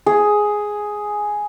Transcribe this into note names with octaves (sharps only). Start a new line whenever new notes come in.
G#4